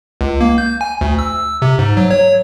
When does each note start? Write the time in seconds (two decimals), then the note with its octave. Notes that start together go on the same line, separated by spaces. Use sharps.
0.21 C#2
0.41 A#3
0.58 G6
0.81 G#5
1.01 D2
1.19 E6
1.62 C3
1.79 G#2
1.97 F#3
2.11 C#5